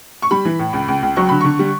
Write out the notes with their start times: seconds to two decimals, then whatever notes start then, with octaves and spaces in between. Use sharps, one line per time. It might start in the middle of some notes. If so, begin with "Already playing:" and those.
0.22 C#6
0.31 G3 B5
0.45 E3
0.59 A2
0.73 C#2
0.88 C#2
1.02 C#2
1.16 F#3 C#6
1.29 D3 B5
1.41 D3 C#6
1.59 G3